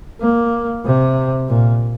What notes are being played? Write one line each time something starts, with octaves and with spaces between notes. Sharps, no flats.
A#3
C3
A#2